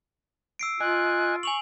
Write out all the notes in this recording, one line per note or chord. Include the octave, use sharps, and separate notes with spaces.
E6 C7 D7
F4 D#5 G#5 F#6
G#5 C#6 F7 F#7